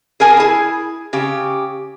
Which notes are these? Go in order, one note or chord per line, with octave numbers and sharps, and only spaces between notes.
G#4 A#4 G#5 A5
E4 G#4
C#3 G4